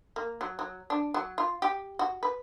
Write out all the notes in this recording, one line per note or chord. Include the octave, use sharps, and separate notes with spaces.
A#3
F#3
F#3
D4
F#3
F4
G4
F#4
B4